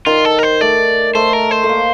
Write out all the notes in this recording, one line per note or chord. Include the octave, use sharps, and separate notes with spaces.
D#3 F4
A4
A#4
C5
A3 D5
A3 C5
A#4
C5
A3
A#3